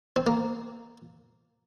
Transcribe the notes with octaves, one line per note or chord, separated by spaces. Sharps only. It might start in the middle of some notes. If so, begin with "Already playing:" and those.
C4
A#3